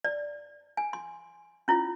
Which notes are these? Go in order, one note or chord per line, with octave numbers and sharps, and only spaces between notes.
D5
G#5
C6
C#4 E4 F4 C#5